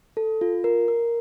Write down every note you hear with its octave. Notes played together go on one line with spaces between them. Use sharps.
A4
F4
A#4
A#4